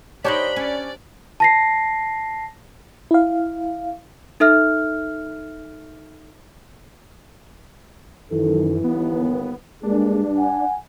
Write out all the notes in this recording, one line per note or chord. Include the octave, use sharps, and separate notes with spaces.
D4 D#4 G4 C5 C#5 G5 B5
C#4 D5
A5 A#6 C7
E4 F5
D#4 A4 E5 F6
F#2 D#3 E3 A4
G1 D#2 B3
G2 G#3 A#3 D4 G#4
F#5 G#5